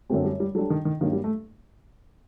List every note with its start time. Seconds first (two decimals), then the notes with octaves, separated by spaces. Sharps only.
0.10 F#2 D3 A3 C4 F#4
0.25 G3
0.40 G3
0.55 F#3 G3 D4 A4
0.70 D#3
0.85 D#3
1.00 G2 D#3 F#3 A#3
1.13 G3
1.24 A3